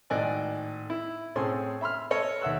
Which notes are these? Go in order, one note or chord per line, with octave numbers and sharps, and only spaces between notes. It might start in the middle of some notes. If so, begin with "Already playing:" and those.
G#1 A2 D5 D#5 G#5 F#6
E4
A2 C4 C#4 G#4 A4 C6
E5 B5 C6 F6
A4 C#5 D#5
D#2 E5 F#5 E6 F#6